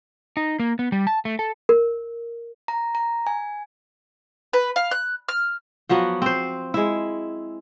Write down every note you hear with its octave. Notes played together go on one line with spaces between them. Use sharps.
D#4
A#3
B3
G3
A5
A3
A4
A#4
A#5
A#5
G#5
B4
F5
F#6
F6
F3 F#3 B3 F#4
C4 C5
G#3 E4